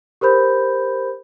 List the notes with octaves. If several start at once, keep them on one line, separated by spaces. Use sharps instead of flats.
G4 A#4 C5 B5 G6